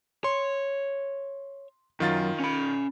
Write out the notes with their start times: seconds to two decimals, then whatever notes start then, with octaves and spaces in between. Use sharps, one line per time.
0.24 C#5 C6
2.00 F#2 D#3 F4 A6
2.40 C#4 B5